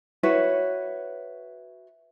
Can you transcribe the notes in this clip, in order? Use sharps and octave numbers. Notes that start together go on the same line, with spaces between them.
E4 F#4 B4 C#5